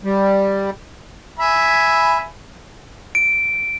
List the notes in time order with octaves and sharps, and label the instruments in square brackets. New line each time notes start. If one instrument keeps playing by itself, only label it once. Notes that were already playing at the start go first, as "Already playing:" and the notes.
[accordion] G3
[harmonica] E5 G#5 B5
[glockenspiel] D7